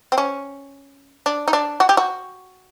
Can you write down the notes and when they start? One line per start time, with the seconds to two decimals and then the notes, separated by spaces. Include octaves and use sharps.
0.12 C4
0.18 C#4
1.26 D4
1.48 D#4
1.53 D4
1.80 F#4
1.89 G4
1.97 F#4